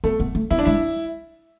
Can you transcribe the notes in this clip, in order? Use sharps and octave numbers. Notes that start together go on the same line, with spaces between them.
A3 B3
B3
A3
B3 E4
D4
G#3 E4